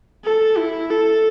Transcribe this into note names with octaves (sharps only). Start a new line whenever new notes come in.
A4
E4
A4